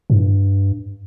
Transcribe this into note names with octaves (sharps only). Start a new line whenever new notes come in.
G#2
G2